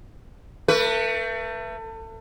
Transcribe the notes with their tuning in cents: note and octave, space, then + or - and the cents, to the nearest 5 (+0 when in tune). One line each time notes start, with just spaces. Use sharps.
A3 +30 B4 -15